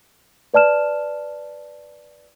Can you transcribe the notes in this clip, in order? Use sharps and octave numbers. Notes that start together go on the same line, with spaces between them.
B4 D5 A5 F6 E7